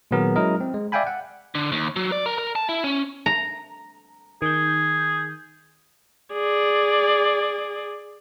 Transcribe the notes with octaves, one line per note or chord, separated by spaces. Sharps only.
A#2 D#3 F#3 B3 G#4 A#4
F#3 G#3 C#4 E4 A#4 D#5
C4
G#3
D5 E5 F5 G5 G#5 B5
F#5
D3
D#2
F#3
D5
A#4
A#4
A5
E4
C#4
A#5
D#3 G#4 G6
G#4 D5